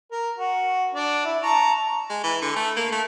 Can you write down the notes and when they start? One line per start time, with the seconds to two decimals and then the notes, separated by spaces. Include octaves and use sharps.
0.11 A#4
0.38 F#4
0.95 D4
1.25 E4
1.43 A5 A#5 C#6
2.09 G#3
2.24 E3
2.42 D3
2.56 A3
2.77 A#3
2.92 A3